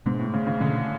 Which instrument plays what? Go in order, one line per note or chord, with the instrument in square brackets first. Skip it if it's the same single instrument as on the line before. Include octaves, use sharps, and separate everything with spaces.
[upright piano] G#2 [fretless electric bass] B2 G#3 B3 D4
[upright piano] A2
C#3
C#3
[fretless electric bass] B2 G#3 C#4 [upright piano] D3